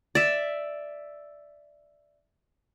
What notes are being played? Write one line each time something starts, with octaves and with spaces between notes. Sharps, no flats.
D5 E5